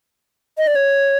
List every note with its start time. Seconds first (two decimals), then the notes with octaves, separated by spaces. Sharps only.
0.58 D#5
0.67 D5
0.76 C#5